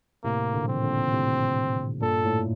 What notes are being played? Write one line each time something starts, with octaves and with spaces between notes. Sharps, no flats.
A2 C3 A#3
A#2 D3
F3 C4
D#3
A#2 D3
A2 C3
G2 A#2 A4
A2